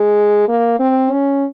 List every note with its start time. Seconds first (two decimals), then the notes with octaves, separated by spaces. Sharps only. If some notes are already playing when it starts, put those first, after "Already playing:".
Already playing: G#3
0.48 A#3
0.79 C4
1.12 C#4